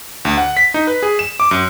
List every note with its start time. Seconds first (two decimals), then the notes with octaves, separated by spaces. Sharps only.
0.25 D2
0.38 F#5
0.57 B6
0.74 D#4
0.87 B4
1.03 G#4
1.19 E7
1.40 D6
1.51 F#2